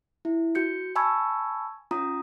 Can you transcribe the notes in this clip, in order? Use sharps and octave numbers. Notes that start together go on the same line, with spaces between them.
E4
F#4 G6 C#7
G#5 A5 B5 C#6 E6 G#6
C#4 F4 A#5 D#6